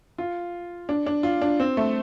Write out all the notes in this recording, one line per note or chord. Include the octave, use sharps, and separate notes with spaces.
F4
D4
D4
F4
D4
C4
A3